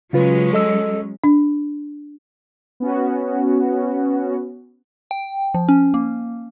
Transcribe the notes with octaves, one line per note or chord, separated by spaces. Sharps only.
C#3 F#3 G#3 C#4 F4 B4
A4 D#5 E6
D4
B3 C#4 F#4
G5
F3
C#4
A#3